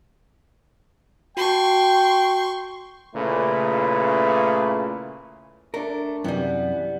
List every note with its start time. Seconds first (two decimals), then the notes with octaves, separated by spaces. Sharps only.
1.37 F#4 G5 A5 C6 C#6
3.16 A#2 C#3 A3 E4 B4
5.74 A3 D4 A#4
6.24 F#2 C3 E3 G3 B3